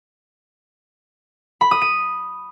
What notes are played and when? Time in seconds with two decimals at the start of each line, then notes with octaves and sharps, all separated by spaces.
1.61 B5
1.71 D#6
1.82 D#7